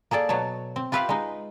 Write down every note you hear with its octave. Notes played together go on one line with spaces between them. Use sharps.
A#3 G#4 A4 D5
B2 F#3 C#5 A5
C4
F4 G4 B4 E5 F5
G#3 D#4